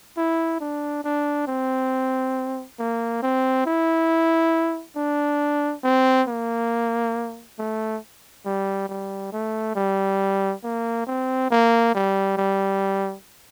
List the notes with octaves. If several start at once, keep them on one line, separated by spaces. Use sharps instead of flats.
E4
D4
D4
C4
A#3
C4
E4
D4
C4
A#3
A3
G3
G3
A3
G3
A#3
C4
A#3
G3
G3